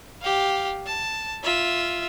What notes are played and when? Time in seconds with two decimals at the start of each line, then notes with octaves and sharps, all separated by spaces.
0.21 G4 F5
0.86 A5
1.44 F4 E5